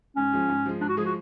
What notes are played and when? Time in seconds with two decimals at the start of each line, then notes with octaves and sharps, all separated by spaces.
0.16 G#2 C#4
0.33 F3 G#3
0.49 G#2
0.66 F3 G#3
0.81 G#2 D4
0.89 F#4
0.97 F3 G#3 G#4
1.05 F#4